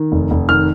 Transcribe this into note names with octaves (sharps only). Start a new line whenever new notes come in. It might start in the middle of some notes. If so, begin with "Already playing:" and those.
Already playing: D#3
F1
F1
D#3 F6